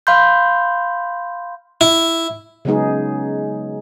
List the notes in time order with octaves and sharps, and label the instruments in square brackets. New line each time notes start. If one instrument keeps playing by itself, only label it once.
[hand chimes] F5 B5 C6 G6
[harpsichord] E4
[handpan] C#3 F#3 G#3 B3 D#4 G#4